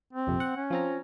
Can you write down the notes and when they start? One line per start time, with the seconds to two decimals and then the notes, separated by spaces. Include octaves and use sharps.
0.13 C4
0.27 A#1 F2 C3
0.40 F#5
0.57 C#4
0.70 F3 C4 A#5